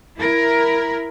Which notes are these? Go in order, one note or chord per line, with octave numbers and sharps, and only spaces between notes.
E4 A#4